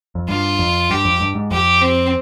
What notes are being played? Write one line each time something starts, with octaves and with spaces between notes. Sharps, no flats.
F2
G2 F4
F2
G2 G4
F2
G2
G#2
F2 G4
C4